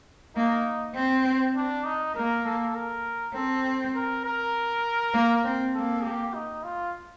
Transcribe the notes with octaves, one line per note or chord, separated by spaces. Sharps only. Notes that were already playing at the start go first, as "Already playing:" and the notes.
A#3 D#4
C4
D4
D#4
A#3 A#4
A4
A#4
C4 A4
A#4
A#4
A#3
C4
A#3 A4
G4
D#4
F4